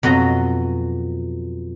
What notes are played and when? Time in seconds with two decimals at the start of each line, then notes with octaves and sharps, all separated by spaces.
0.03 F2 B2 F#3 D#5 A#5